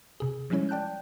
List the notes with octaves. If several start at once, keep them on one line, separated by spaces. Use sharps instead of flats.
C3 G#4
F3 G3 G#3 C#4 E4 C#5
D5 G5 A5 F#6 G6